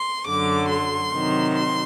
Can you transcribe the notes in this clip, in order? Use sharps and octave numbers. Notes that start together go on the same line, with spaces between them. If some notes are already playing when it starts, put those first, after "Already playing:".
Already playing: C6
F#2 D3 F#3 D6
C6
C3 D#3 F#3
C6